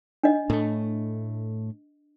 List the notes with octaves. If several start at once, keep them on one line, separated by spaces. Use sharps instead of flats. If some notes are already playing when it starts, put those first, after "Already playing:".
D4 D#5
A2 A3